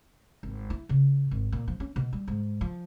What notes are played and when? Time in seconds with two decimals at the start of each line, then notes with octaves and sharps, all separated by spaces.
0.43 G#1
0.70 E4
0.89 C#3
1.31 G#1
1.52 A#2
1.68 F3
1.80 C#4
1.96 B2
2.13 G3
2.28 G#2
2.61 F3